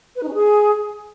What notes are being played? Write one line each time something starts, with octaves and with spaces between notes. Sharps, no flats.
B4
D#4
C#4
G#4